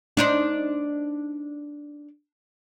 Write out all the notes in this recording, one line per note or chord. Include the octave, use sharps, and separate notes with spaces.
D4 D#4 C5